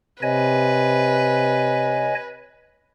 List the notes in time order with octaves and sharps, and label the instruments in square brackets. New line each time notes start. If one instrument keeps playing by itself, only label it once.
[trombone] C3 [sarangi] B4 [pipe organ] C#5 D#5 G#5